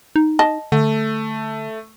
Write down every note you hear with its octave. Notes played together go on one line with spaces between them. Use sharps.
D#4
D#5 A5
D3 A3